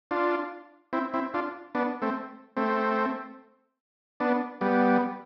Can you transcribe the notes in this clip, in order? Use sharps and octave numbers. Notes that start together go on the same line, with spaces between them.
D4 F4
C4 E4
C4 E4
D4 F4
B3 D4
A3 C4
A3 C4
B3 D4
G3 B3